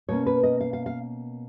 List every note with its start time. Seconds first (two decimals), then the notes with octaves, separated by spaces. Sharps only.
0.09 B2 A#3 C#4 C#5
0.26 B4
0.43 D#5
0.60 F5
0.73 F5
0.86 F5